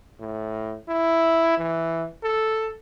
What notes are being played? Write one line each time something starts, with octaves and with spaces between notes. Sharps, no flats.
A2
E4
E3
A4